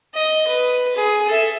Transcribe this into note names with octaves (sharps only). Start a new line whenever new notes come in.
D#5
B4
G#4
A4 E5